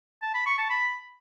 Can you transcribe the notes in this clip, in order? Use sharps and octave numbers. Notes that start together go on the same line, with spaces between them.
A5
B5
C#6
A5
B5